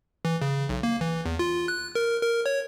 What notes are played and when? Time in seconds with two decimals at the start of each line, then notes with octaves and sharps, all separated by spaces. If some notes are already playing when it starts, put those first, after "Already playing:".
0.25 E3
0.42 C#3
0.69 B1
0.83 A#3
1.01 E3
1.26 E2
1.39 F4
1.68 F#6
1.95 A#4
2.22 A#4
2.46 C#5